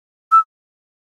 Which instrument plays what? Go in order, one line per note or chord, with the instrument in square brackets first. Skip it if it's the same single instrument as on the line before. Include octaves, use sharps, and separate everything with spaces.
[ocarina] E6